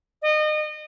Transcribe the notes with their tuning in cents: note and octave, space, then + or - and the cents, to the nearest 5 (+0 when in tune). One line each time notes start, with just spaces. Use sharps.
D#5 -30